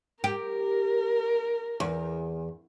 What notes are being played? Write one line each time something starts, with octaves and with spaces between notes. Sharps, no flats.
G4 A#4
E2